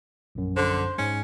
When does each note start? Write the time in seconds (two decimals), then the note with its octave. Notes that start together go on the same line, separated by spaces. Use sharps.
0.35 A#1 F#2
0.57 D3 C5
0.98 G#2 G#3 C#4